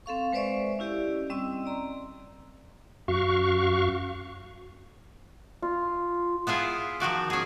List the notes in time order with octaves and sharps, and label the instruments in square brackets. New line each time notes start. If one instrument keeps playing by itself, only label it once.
[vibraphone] C4 A4 F5 C#6
G#3 B4 C5 D5 E5 C#6
C#4 E4 G4 D5 D#5
G3 C4 C#4 D#5 E6
D5 A#5 C6
[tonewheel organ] F#2 F#4 F5 C#6
[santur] F4
[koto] B3 E4 F4 G#4
D#3 F3 F#4 D5
C#4 G#4